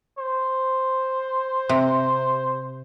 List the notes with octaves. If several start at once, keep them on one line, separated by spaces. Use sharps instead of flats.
C5
C3